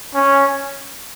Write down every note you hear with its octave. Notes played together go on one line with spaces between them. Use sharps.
C#4